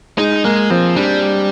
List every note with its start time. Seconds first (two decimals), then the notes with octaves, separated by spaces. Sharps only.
0.18 G#3 D#4
0.44 G#3 A#3
0.70 F3 C4
0.96 G3 D4